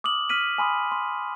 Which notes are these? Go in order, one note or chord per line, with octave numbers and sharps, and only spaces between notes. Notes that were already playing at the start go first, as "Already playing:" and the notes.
D6 D#6 F6 F#7
F6 B6 D#7 F#7
G#5 B5 C6 D#6
C6